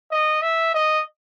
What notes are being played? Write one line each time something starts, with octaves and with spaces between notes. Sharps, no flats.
D#5
E5
D#5